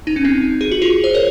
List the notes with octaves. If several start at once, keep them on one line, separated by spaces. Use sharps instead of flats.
D#4
C#4
C4 D#4
G#4
F#4
F4 G#4
C5
A#4 C#5